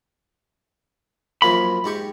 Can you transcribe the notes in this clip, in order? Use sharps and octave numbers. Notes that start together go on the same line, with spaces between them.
F#2 F3 A#3 B5
G#2 G4 C#6